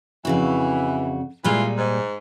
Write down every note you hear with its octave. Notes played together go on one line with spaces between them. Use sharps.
F2 C#3 E3 F#4
A#2 E3 G3 G#3 F4
G#2